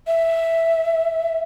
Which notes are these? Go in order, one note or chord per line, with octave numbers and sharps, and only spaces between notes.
E5